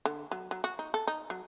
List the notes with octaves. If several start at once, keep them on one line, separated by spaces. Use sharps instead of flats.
D3
F#3
F#3
F#4
D#4
A4
D#4
F#3